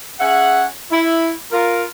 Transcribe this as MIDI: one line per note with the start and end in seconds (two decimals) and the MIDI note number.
0.20 0.64 61
0.20 0.64 68
0.20 0.64 76
0.20 0.64 78
0.91 1.32 64
1.52 1.85 65
1.52 1.85 70